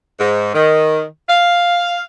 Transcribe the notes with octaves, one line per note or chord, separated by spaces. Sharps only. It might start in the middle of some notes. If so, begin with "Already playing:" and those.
G#2
D#3
F5